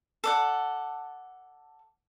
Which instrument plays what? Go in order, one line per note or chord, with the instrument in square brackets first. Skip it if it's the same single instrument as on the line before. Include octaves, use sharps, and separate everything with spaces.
[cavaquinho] A4 D5 F#5